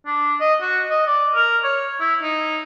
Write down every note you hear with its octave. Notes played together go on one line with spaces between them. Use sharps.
D4
D#5
F#4
D#5
D5
A#4
C#5
E4
D#4